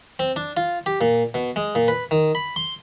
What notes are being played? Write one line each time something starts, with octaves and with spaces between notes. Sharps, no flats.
C4
D4
F4
G4
A#2
B2
G#3
A#2
B4
D#3
B5
C6